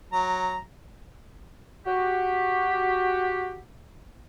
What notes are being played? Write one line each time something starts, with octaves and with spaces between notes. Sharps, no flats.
F#3 A#5
F#4 G4